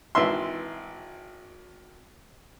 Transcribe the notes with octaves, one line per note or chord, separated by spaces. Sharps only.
G#1 E3 E5 C6